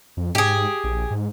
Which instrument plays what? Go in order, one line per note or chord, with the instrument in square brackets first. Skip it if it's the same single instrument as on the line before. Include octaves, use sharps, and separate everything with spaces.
[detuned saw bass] F2
[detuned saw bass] G#2 [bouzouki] G4 G#4
[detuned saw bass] A#1
G#2